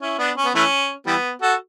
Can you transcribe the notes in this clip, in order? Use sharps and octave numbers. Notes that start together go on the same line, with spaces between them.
C#4 E4
B3 D4
C#4
B3
E3 A3 C#4
E3 G3 B3
F#4 A4